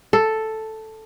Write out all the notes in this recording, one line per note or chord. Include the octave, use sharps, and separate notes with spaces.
A4